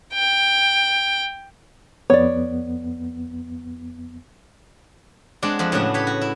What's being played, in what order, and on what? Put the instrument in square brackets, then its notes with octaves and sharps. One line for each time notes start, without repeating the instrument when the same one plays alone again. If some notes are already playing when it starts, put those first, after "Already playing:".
[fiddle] G5
[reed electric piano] F2 B3 [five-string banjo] C#5 D5
[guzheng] G#3 C4 D4 D5 F#5
F2 C4 F#5
A2 C#3 B3 D4 F#4
G4 B4 C#5
F#4
E4